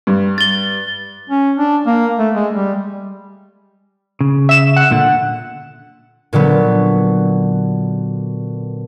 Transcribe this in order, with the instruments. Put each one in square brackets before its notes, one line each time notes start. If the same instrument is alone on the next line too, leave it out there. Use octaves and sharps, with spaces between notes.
[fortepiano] G2
[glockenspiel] A6 G7
[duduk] C#4
D4
A#3
A3
G#3
G3
[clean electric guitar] C#3
[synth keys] E5 E7
F#5
[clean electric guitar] A#2 D3
[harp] A#2 D3 F#3 B3